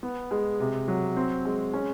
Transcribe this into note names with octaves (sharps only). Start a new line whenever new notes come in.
B3
G#3
C3
F#3
C4
G#3
C#4